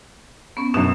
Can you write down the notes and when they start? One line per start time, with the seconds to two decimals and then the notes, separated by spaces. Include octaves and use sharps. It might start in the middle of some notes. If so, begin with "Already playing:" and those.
0.57 B3 C#4
0.74 F#2 B2 E7